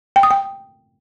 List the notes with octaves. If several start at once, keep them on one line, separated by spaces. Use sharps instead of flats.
G5
D#6
G5